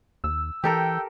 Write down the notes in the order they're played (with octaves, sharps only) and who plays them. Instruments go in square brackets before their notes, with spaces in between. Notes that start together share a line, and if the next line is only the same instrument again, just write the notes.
[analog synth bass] D#2 [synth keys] E6
[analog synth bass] E3 [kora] G4 A4 A#4 [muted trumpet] G5